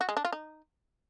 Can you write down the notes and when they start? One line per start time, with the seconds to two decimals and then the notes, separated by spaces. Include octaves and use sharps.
0.01 F#4
0.09 G#3
0.17 D4
0.25 F4
0.32 D#4